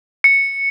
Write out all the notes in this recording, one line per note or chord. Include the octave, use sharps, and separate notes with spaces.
C#7